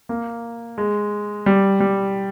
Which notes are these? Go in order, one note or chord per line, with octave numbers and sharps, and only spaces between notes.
A#3
G#3
G3
G3